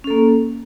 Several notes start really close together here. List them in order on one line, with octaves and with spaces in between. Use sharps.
C#4 A4 A#3